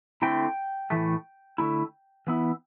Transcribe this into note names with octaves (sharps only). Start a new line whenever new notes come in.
D3 A3 C4 E4 G5
A2 E3 A3
D3 A3 E4
E3 B3 E4